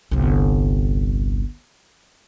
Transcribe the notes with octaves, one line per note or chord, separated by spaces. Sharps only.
G1 C2